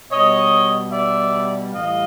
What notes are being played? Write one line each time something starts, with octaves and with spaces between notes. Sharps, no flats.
B2 G3 C#5 D#5
D5 E5
A2 E3 G3 D#5 F5